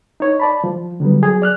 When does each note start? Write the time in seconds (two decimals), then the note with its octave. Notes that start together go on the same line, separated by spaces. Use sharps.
0.20 D#4 C#5
0.40 D5 A5 B5
0.64 F3
1.00 D3 F#3 G3 B3
1.22 F#3 G#4
1.42 D5 F6 F#6